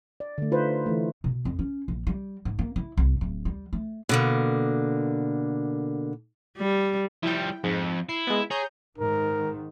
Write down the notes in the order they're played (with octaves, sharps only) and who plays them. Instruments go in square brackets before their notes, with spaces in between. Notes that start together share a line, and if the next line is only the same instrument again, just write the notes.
[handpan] D5
D3 A3
D#4 F4 B4 C5
E3 A3
[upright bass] B2
F2
C#4
A#1
G3
G#2
A#3
E4
C2
D1
G3
A3
[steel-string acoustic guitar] B2 D3 A#3
[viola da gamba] G3
[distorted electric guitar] F3 G3 [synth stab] E4 G5
[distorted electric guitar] F2 [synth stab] G#2
[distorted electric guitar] E4 [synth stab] C7
[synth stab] G#3 B3
[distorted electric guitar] G#4 [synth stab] C#5 A#5 G6
[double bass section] G#2 D#3 [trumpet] A#4